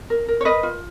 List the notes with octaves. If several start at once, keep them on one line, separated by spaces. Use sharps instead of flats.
A#4
A#4
C#5
A#4 B4 D#5
F4